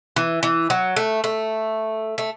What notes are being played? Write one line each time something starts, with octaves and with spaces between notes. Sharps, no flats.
E3
E3
F#3
A3
A3
A3